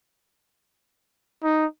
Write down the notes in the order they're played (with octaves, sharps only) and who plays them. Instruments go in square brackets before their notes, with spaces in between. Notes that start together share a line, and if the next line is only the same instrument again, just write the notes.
[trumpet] D#4